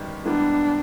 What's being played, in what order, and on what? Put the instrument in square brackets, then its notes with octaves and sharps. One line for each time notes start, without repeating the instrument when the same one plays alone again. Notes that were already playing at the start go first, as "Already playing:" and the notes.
Already playing: [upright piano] G1 F#2 D#3 G3
[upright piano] G#2 E3 G3 B3 [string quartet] D4